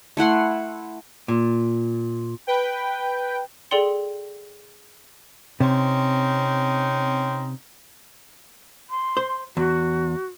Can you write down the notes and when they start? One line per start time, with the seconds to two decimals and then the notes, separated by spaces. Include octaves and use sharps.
0.17 A3 E4 F#5 C6
1.28 A#2
2.47 B4 G5
3.71 G#4 A4 D5 G5 C6 C#7
5.60 C3 C4 C#4 D#4
8.90 C6
9.17 C5
9.57 E2 F#4